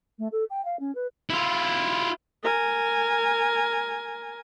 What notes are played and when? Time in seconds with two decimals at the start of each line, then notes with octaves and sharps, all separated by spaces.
0.19 A3
0.32 A4
0.50 G5
0.65 F5
0.80 C#4
0.95 B4
1.30 E4 F4
2.44 A#4 G#5